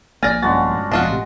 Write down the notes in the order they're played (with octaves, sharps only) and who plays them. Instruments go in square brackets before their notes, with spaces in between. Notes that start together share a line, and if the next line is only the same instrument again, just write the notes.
[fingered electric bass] A#1 A#3 [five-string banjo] D5 G#5 [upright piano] F6 A6 A#6
[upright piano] G1 C#4 A6 [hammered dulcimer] G#3 D4 F#4
[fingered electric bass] F2 B2 [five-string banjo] D4 F4 F#4 [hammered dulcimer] D#5
[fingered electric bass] A1 C3